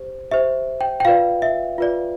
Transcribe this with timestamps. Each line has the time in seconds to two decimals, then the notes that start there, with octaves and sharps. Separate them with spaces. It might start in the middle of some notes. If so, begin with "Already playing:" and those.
Already playing: G4 C5
0.31 G4 C5 E5
0.81 G5
1.00 G5
1.05 F4 B4 D5 F5
1.42 E5
1.78 F4 B4 D5